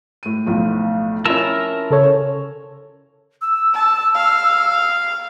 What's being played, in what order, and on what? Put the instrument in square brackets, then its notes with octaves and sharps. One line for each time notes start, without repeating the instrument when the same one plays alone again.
[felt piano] A2 D#7
B1 A2 F3
[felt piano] C#4 E4 F4 [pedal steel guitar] A#4 A5 E6
[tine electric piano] C#3 A4 C#5
[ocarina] E6
[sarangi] A5
F5